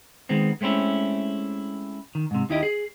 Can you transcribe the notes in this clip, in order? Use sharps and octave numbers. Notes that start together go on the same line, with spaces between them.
D#3 G#3 B3 C4
G#3 A3 C4 C#4 E4
D#3
G#2 C3
D#2 D#4 E4 G4 D#5
G#4